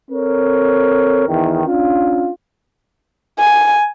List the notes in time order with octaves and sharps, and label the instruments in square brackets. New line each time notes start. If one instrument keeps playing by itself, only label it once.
[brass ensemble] C4 A4 A#4 C#5
E2 D#3
C#4 D4 F4
[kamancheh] G#5